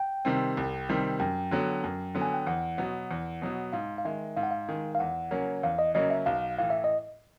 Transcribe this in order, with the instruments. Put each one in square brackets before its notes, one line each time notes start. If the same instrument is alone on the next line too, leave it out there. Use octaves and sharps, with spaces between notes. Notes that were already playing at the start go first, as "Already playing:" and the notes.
Already playing: [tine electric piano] G5
[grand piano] C3 D#3 G3 C4
C2
C3 D#3 G3 C4
[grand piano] F#2 [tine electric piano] G5
[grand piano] D3 F#3 B3
F#2
D3 F#3 B3
[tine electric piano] G#5
G5
[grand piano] E2 [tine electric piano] F#5
[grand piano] B2 F#3 B3
E2
B2 F#3 B3
[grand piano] G#2 [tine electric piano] F5
[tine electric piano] F5
[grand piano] D#3 G#3 [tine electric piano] E5
[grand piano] G#2 [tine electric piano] F5
[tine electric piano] F#5
F5
[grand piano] D#3 G#3
[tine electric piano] F5
[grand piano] E2 [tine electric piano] F#5
[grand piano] C#3 F#3 A#3 C#4
[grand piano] E2 [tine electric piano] F5
[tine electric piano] D#5
[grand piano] C#3 F#3 A#3 C#4 [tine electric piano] D#5
[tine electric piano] E5
[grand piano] B1 [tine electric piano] F5
[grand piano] A2 E3 [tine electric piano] F5
[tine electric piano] E5
D#5